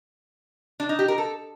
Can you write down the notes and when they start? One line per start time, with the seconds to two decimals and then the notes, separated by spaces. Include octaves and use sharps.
0.80 D4
0.89 D#4
0.99 G4
1.08 A#4
1.18 A4